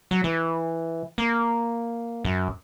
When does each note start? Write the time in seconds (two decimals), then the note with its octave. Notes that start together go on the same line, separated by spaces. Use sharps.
0.11 F#3
0.24 E3
1.18 A#3
2.25 F#2